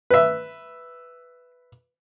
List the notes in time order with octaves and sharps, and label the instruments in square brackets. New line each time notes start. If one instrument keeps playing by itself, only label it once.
[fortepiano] B4 E5